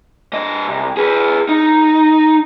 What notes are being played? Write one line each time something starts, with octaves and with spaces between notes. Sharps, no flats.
G2 D#5
C2
G#4 B4
D#4